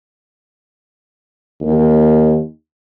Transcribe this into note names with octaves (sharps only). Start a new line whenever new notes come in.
D#2